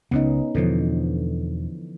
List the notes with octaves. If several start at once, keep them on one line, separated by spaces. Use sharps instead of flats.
C#2 C#3 B3 C#4 D#4
E2 B2 D3 E3 F3